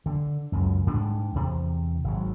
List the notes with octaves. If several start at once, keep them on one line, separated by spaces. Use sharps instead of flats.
D3
C#2 F#2
G#2 G3 G#3 D4
E2 C3
G#1 F#3